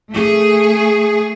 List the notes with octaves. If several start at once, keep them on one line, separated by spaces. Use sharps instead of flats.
A3 G#4